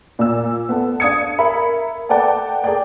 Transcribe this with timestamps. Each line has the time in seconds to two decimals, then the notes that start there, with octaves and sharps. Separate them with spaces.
0.19 A#2 E6
0.69 B3 A4
1.00 D4 F5 D#6 G#6 C#7
1.39 A#4 E5 B5
2.09 A4 B4 D5 F#5 G5 A5
2.64 G#4 A#4 D5 G5